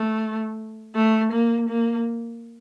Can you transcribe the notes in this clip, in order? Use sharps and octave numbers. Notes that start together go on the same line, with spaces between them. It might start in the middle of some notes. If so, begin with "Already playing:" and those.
Already playing: A3
A3
A#3
A#3